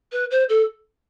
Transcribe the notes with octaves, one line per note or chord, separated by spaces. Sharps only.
B4
C5
A4